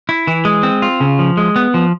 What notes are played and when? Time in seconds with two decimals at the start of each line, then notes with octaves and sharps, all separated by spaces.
0.09 E4
0.27 E3
0.45 G#3
0.63 C4
0.82 F4
1.00 C#3
1.19 F3
1.37 G#3
1.56 B3
1.74 F3